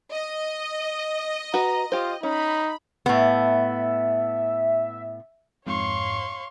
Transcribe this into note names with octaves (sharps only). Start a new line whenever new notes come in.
D#5
F#4 B4 A#5
F4 G4 C5
C#4 D#4 B5
A2 B3 E5
F2 G#2 C#5 F5 C6 C#6